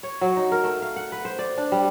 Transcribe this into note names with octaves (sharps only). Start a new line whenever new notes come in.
C#5
F#3
D#4
A#4
A3
F5
F#5
B4
C5
D5
D4
G3